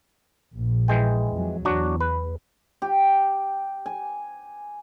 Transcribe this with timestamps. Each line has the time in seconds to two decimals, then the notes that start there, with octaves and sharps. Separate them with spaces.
0.57 A#1
0.88 E3 G#3 G5
1.33 F2 F#3
1.65 E2 F#3 D4 F#4
2.01 B4
2.82 G4
3.86 G#5